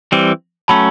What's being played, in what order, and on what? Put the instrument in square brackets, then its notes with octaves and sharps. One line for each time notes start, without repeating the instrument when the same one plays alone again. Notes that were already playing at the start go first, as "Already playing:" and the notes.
[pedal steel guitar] E3 G3 C4
[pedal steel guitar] F#3 A3 C#4 [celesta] A5 B5